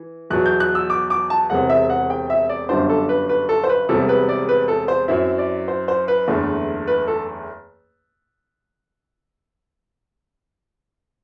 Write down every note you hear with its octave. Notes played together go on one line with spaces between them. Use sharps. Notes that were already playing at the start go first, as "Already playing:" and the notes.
Already playing: E3
E2 B2 F#3 F#6
G6
F#6
E6
D6
D6
A5
E1 E2 C3 F#5
E5
F#5
G5
E5
D5
G1 F#2 D3 G3 D4 C5
A4
B4
B4
A4
C5
B4
E1 E2 C3 G3 A4
B4
D5
B4
A4
C5
F#2 F#3 C4 E4 E5
D5
C5
C5
B4
F#1 E2 D3 A3
B4
A4